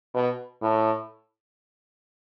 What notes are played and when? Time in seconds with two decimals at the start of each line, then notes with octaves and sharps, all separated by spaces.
0.14 B2
0.62 A2